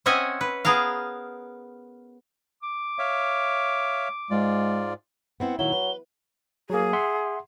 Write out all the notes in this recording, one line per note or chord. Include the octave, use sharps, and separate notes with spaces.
C4 C#4 D#5 E5 F#5 G#5
B4
B3 G#4 A#4 F5
D6
C#5 E5 F5
G#2 G#3 F4 D5
B3 C4 E4 F#5
A#2 D#3 F#3 E4 G7
B4
F#3 A#3 G#4
E5 F#5 C6